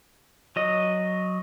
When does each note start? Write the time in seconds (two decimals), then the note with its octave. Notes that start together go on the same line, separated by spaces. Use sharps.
0.56 F#3 D#5